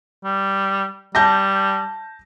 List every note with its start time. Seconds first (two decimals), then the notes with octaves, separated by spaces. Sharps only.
0.24 G3
1.15 G3 A5 G6 A#6